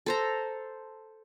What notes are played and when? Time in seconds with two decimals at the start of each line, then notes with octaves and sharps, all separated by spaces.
0.06 A4 C5 A#5